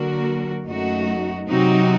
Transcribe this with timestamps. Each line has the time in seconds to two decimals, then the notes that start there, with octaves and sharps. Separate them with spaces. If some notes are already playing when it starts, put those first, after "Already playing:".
Already playing: D3 F#3 A#3 F#4 A#4
0.66 F#2 F#3 A3 D#4 F#4
1.48 C3 F#3 C4 D#4 F#4